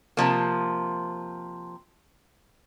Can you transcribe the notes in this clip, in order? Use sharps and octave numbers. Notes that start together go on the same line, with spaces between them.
C3 F3 A#3